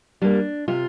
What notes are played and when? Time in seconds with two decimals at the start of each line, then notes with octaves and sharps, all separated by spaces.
0.22 G3 A#3 D4
0.68 C3 F4